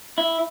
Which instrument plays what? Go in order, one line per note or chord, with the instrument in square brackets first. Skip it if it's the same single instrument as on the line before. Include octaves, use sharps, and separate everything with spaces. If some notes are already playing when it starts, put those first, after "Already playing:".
[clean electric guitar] E4